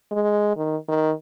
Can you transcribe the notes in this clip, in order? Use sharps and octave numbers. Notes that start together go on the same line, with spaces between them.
G#3
D#3
D#3